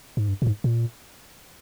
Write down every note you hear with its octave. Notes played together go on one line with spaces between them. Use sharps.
G#2
G2
A#2
G#2
A#2